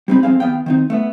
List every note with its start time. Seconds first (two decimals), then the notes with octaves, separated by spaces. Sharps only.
0.08 G3 C4 D#4 B5
0.23 F3 G#3 C4 G#4 F5
0.40 D#2 B3 F5 G5
0.66 D#3 C4 D#4
0.90 A3 B3